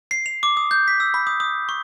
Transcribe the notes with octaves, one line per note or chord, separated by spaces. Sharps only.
C7
F7
D6
D#6
G6
B6
E6
B5
D#6
D#6
C#6